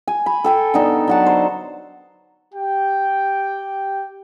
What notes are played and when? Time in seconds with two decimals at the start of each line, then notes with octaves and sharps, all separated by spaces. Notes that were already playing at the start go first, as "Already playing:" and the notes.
0.08 G#5
0.26 B5
0.44 A4 G5 G#5
0.74 D3 B3 D#4 A4
1.08 F#3 F#5 A5
1.26 C5
2.54 G4 G5